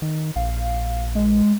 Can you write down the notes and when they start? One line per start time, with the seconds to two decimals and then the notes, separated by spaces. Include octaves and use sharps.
0.02 D#3
0.36 A#1 F5
1.15 G#3